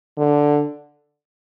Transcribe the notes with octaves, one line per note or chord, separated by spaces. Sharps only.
D3